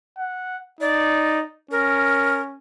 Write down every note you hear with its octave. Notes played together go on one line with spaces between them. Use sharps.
F#5
D#4 D5
C#4 A#4